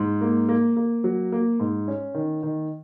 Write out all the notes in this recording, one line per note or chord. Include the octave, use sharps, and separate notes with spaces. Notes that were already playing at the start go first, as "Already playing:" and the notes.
Already playing: G#2
A#3
A#3
A#3
F#3
A#3
G#2
C#4
D#3
D#3